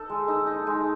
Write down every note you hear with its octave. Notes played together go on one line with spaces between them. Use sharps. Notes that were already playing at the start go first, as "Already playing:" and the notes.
Already playing: D#4 A4
G#3
D#4
D#4
G#3